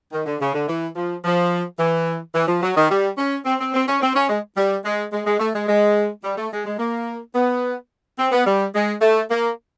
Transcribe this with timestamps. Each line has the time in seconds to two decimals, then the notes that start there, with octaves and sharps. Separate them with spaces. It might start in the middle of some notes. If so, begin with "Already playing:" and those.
0.12 D#3
0.26 D3
0.40 C#3
0.54 D3
0.68 E3
0.96 F3
1.24 F3
1.78 E3
2.35 E3
2.48 F3
2.63 F#3
2.76 D#3
2.89 G3
3.18 C#4
3.45 C4
3.60 C4
3.74 C4
3.88 C#4
4.02 C4
4.15 C#4
4.29 G#3
4.57 G3
4.85 G#3
5.12 G#3
5.26 G#3
5.40 A3
5.54 G#3
5.68 G#3
6.24 G3
6.37 A3
6.52 G#3
6.66 G#3
6.79 A#3
7.35 B3
8.18 C4
8.32 B3
8.46 G3
8.74 G#3
9.01 A3
9.30 A#3